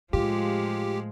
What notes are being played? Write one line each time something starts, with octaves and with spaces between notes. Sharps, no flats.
A2 F3 G#3 F4 G4